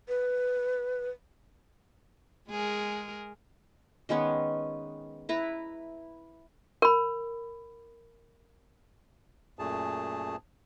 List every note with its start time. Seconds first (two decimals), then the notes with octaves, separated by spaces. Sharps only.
0.08 B4
2.49 G#3 G#4 A#4
4.09 D#3 G#3 B3 C#4
5.29 E4 B4 A#5
6.82 A#4 B5
9.59 F#2 A#2 A3 G#4 A5